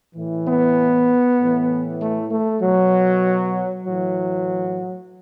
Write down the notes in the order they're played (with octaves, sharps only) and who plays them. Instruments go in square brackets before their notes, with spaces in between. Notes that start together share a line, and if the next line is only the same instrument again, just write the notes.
[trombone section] A2 E3
B3
A2 E3
A3
A3
B2 F#3
A2 E3 F#3